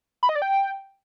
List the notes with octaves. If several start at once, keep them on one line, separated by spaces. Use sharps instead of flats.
B5
D#5
D5
G5